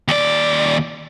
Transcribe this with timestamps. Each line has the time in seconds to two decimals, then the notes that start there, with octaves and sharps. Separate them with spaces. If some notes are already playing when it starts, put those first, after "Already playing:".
0.08 D#2 D5